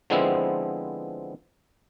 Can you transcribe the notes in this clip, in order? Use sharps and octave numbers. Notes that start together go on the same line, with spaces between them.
D3 F3 G#3 B3 C4 E4